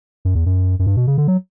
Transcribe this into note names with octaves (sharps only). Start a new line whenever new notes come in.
F#2
E2
F#2
F#2
G2
B2
C#3
D3
F#3